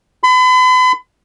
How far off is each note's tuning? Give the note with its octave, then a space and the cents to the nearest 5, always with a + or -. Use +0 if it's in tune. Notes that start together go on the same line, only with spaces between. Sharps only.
B5 +40